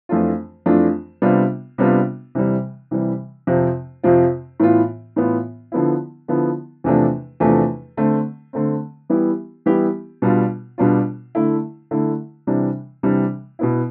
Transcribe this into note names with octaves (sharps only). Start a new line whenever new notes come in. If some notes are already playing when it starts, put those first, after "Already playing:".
F2 E3 A3 D4 F4
F2 E3 A3 D4 F4
C3 G3 B3 D4 F4
C3 G3 B3 D4 F4
C3 E3 G3
C3 E3 G3
F2 C3 F3 C4 F4
F2 C3 F3 C4 F4
A2 E3 B3 F4
A2 E3 B3 F4
D3 F3 B3 E4
D3 F3 B3 E4
E2 C3 F3 A3 D4
E2 C3 F3 A3 D4
D3 A3 C4
D3 A3 C4
E3 G3 B3 E4 G4
E3 G3 B3 E4 G4
B2 G3 D4 F4
B2 G3 D4 F4
D3 A3 E4
D3 A3 E4
C3 E3 G3 D4
C3 E3 G3 D4
B2 B3 E4